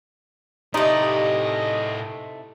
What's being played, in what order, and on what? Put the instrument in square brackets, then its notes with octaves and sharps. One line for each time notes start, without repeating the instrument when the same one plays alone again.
[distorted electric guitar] A2 D5 [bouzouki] C3 A3 [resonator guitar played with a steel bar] D#4 [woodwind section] G#4 D#5